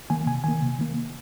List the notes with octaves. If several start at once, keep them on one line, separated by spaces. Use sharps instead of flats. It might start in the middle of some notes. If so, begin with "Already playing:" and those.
D#3 A#3 G#5
C3 G#5
D#3 A#3 G#5
C3
D#3 A#3